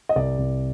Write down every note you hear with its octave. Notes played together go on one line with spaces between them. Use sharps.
D#5
C2 D5
C2